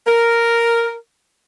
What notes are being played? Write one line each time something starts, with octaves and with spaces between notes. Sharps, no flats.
A#4